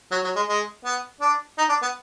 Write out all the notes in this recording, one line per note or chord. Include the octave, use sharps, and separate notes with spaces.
F#3
F#3
G#3
G#3
B3
D4
D#4
D4
B3